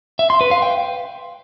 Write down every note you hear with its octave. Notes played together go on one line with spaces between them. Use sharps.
E5
C6
B4
F5
G5